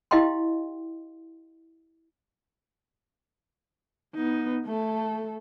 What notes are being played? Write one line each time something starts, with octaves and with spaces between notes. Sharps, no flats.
E4 G4 D#5 F5 G5 C6
B3 D#4
A3 A4